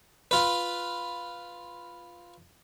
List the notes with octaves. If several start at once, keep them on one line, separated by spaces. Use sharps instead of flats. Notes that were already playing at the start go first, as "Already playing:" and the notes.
F4 B4